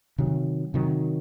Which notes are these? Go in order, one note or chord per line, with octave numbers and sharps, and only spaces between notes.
C3 D#3 F#3
C3 D#3 F#3